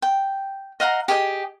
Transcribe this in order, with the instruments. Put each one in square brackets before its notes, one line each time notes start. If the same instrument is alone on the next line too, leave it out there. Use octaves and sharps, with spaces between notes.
[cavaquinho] G5
D#5 F5 F#5 A#5
G4 G#4 D#5 G5